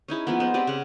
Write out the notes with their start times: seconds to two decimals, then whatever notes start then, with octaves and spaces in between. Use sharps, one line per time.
0.08 C#4 D#4 E4 G#4
0.27 F3 G#3 A#3 B3
0.40 G#3 B3 C5
0.54 C4 G4 D5 D#5
0.67 C#3 F#5